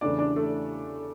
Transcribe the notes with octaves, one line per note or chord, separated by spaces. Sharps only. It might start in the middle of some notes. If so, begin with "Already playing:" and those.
E2 C#3 E3 A3 C#4 D4 D5
D4 D5
A3 A4